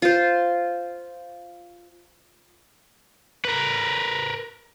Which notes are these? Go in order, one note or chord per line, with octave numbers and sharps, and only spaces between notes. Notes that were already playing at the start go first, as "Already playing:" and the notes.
F4 C5
A#4 B4